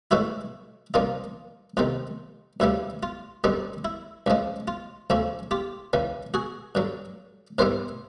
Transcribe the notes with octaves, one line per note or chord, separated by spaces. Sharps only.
A2 E3 G#3 E4 F#4
C2 A#2 F3 A#3 D#4 F4
F2 C3 D#3 F4
D2 C#3 E3 G3 E4
F4
F#2 D3 G3 C4 D#4
E4
C#2 C#3 F3 G#3
F4
D2 C#3 F3 A3 C#4
F4 G4
C#2 C#3 E3
F#4 G#4
G2 D3 F#3
G#2 E3 G3 B3 E4 A#4 C5